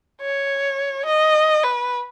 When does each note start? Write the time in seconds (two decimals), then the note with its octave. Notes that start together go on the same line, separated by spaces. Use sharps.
0.21 C#5
1.06 D#5
1.63 B4